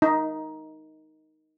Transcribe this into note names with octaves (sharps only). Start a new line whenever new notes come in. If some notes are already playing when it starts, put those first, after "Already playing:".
D#4